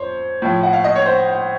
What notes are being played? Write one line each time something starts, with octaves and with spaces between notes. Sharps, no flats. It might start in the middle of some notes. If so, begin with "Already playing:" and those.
Already playing: F2 C5 C#5
A2 F3
F#5
F5
D#5
C#5
C5